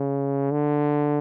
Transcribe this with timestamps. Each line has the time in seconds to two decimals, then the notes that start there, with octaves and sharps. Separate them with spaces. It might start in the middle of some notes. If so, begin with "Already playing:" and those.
Already playing: C#3
0.51 D3